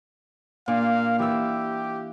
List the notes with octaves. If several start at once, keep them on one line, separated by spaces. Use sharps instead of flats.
A#2 D4 F5
E3 G4 E6